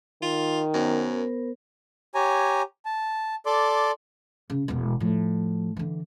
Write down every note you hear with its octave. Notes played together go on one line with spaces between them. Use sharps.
D#3 F4
F#2 B3 A#4 C5
G4 C#5 G#5 A#5
A5
A4 D5 C6 D6
C#3
E1 B2
A2 F3
D3 E3